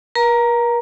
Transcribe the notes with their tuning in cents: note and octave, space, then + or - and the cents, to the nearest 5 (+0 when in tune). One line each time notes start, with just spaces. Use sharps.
A#4 +40 A#5 +0